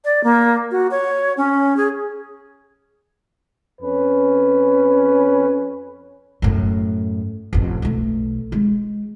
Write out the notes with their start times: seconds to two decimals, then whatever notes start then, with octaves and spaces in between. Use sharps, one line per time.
0.05 D5
0.24 A#3
0.71 F#4
0.91 C#5
1.37 C#4
1.77 G#4
3.81 F2 C#4 B4
6.42 F#2 A2
7.53 A1 F2
7.82 B1 A3
8.52 G#3